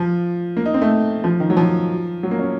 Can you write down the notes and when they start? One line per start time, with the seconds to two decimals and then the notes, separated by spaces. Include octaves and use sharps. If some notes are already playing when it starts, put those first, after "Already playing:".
Already playing: F3
0.57 A#3
0.65 D#4
0.74 C4
0.82 A3
1.24 F3
1.40 D#3
1.50 F#3
1.57 F3
2.23 F#3
2.31 A#3
2.39 C#4